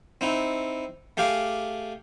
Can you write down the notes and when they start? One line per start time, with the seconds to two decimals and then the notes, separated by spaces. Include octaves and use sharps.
0.21 C4 D#4 E4
1.17 A3 G4 G#4 F5 D6